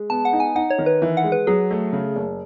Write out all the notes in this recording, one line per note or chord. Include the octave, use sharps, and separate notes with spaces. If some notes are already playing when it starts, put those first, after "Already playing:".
Already playing: G#3
B3 A5
F#5
D#4
G#5
D#4 F#5
C#5
D#3
B4
E3
F#5
G#3
B4
F#3 G#4
A3
C#3
F#1